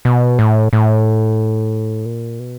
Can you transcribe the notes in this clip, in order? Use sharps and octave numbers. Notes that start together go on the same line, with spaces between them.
B2
A2
A2
A#2
B2